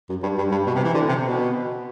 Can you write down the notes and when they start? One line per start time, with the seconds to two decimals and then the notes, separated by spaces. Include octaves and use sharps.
0.09 F#2
0.23 G2
0.38 G2
0.51 G2
0.66 B2
0.75 C3
0.84 E3
0.94 D3
1.09 C3
1.23 B2